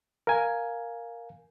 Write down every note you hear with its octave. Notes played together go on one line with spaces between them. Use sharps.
A#4 F5 G#5